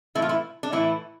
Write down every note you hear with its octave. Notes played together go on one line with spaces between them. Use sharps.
A2 E3 A3 E4
F4
E4
D4
A2 E3 A3 E4